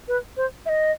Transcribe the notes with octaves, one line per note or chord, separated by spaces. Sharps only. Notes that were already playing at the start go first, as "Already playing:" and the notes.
B4
C5
E5
D#5